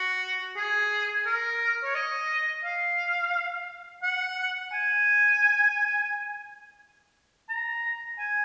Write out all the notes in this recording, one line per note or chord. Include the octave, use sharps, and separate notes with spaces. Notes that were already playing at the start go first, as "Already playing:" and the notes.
Already playing: F#4
G#4
A#4
C#5
D#5
F5
F#5
G#5
A#5
G#5